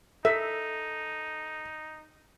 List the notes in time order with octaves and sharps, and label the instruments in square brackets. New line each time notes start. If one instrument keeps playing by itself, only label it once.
[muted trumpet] D#4 [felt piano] A4 [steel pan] E5